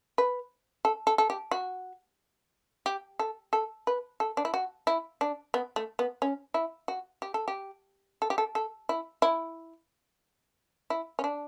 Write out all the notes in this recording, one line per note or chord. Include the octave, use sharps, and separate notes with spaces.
B4
A4
A4
A4
G4
F#4
G4
A4
A4
B4
A4
D4
E4
F#4
E4
D4
B3
A3
B3
C#4
E4
F#4
G4
A4
G4
A4
G4
A4
A4
E4
E4
E4
C#4
D4